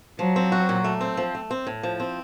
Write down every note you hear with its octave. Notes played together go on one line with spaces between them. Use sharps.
F3 F#3
C4
F#4
A#2
A3
C4
F3
A3
C4
A2
F3
C4